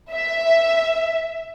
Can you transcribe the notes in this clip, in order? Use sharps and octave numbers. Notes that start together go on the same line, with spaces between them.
E5